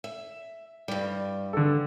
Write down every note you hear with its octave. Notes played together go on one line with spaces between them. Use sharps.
E5
G2 G3
D3 A4